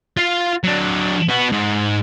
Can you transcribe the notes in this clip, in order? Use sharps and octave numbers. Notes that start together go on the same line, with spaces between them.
F4 F5
F#3 D4
B3 F#4
G#2